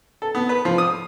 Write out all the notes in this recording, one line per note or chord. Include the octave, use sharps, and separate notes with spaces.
A4
B3
B4
F3
D#6